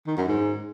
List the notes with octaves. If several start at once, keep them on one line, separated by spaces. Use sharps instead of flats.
D#3
F#2
G#2